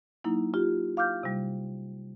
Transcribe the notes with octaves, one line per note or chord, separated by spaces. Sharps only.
F#3 A#3 D#4 E4
F4 G4
F5 D6 F6 G6
C3 G3